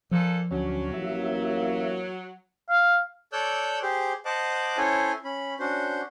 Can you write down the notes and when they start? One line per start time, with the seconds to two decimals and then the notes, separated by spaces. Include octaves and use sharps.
0.11 A#2 F3 A4
0.51 D2 F#3 C#4
0.94 A1 A#3 E5
2.69 F5
3.33 A4 C#5 D5 E6 F#6 G6
3.82 G4 G#4 C5
4.25 C5 D#5 F#5 A5 D6 F#6
4.78 C#4 E4 A4 C5 C#5 G#5
5.24 C#4 B5
5.60 C#4 D4 F#4 C5